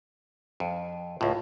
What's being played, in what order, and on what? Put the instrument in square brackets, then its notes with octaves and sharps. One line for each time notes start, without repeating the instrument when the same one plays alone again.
[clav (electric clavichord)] F2
[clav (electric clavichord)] C#2 A2 [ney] F4